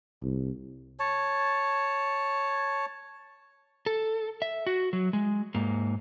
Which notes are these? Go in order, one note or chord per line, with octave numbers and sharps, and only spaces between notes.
C2
C#5 A5
A4
E5
F#4
F#3
G#3
G#2 A#3